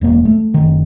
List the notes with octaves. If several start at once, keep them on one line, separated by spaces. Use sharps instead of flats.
E1 G#3 A#3
A3
F#1 D#3